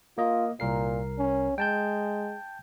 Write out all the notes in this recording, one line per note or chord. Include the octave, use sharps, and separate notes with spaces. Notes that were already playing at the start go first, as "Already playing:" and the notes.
A#3 F4 D#5
C2 A#2 A#4 C7
C#4
G#3 G5 A5 G6